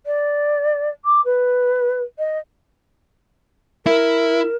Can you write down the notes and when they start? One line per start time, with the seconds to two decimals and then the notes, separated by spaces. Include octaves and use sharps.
0.06 D5
1.05 D6
1.25 B4
2.18 D#5
3.86 E4 A#4